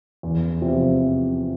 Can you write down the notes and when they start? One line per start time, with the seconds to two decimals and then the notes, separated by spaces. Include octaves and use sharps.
0.23 E2
0.62 C3 F3